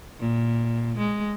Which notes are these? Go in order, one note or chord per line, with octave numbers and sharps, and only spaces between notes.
A#2
G#3